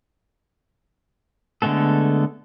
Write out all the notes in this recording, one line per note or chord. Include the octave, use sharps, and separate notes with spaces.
D3 G#3 A3 B3 A4